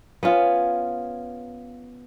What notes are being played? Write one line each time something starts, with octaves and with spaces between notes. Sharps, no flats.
B3 C#4 F4